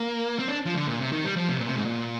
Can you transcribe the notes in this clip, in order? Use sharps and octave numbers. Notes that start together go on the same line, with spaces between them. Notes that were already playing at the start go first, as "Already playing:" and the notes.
Already playing: A#3
C4
D4
F3
D3
A#2
C3
D#3
G3
F3
C3
A#2
C3
G#2
A#2